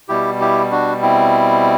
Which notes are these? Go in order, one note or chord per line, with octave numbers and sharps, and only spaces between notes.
B2 G3 E4 G4
E4 G4
D4 F#4
C4 E4